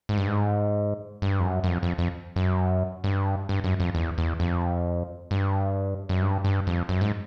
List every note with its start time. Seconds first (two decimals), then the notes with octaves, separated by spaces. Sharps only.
0.09 G#2
0.17 G2
0.27 G#2
1.22 G2
1.40 F2
1.45 F#2
1.64 F#2
1.68 F2
1.83 F2
1.98 F2
2.36 F#2
3.04 G2
3.49 G2
3.64 F#2
3.80 F2
3.95 E2
4.18 E2
4.40 F2
5.31 G2
6.09 F#2
6.22 G2
6.44 G2
6.67 F2
6.89 F#2
7.01 G#2